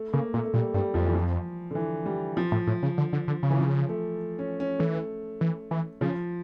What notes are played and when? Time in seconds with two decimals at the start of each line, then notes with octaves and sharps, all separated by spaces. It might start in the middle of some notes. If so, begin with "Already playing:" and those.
Already playing: A3
0.13 C#3 A#3
0.34 A#2 A3
0.45 A3
0.54 A#2 G3
0.74 G2 G3
0.94 F2 F3
1.05 E3
1.15 F3
1.71 D3
1.75 E3
2.06 G3
2.37 F3
2.52 A2
2.67 A2
2.83 C#3
2.98 D3
3.13 D3
3.28 D3
3.43 C#3
3.50 E3
3.58 F3
3.89 A3
4.39 C#4
4.60 C#4
4.79 E3 A3
5.41 E3
5.71 E3
6.01 C#3 F3